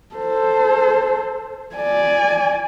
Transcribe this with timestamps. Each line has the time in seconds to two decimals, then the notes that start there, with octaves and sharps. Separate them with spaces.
0.15 A4 C5
1.76 D5 G#5